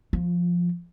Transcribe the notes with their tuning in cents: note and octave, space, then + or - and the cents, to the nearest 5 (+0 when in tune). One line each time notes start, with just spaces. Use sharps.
F3 +0 F4 +30